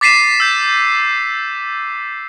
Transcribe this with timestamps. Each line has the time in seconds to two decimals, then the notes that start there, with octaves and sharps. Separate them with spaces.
0.01 D6 A6 B6 C7 D#7 E7
0.40 E6 G6